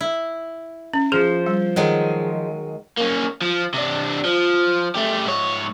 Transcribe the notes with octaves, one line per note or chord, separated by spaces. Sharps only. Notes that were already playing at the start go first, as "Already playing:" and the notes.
E4
C#4
F3 G#4 C5
G3
D#3 F#3 G#3
A#3 C#4
F3
C3 D4
F3
A3 G4
G#2 C#5